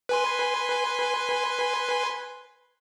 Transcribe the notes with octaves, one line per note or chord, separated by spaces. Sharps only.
B4 G#5 C6